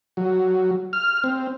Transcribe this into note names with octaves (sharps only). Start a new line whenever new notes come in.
F#3
F6
C4